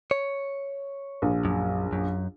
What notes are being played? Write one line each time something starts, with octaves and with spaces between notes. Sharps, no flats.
C#5
A#1
F#2
F#2